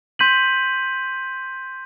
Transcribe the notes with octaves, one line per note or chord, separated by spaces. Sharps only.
C6 G6 B6 D#7 F#7